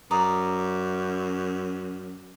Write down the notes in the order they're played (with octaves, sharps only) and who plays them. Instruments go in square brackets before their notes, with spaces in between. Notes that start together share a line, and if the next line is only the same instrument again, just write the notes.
[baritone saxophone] F#2 [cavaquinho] D5 A#5 D#6